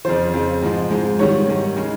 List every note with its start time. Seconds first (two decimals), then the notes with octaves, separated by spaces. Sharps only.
0.05 F2 C#3 F3 C5
0.33 F2 C#3 F3
0.62 G#2 F3 G#3
0.91 G#2 F3 G#3
1.19 G#2 D#3 G3 C#5
1.48 G#2 D#3 G3
1.76 C#3 G#3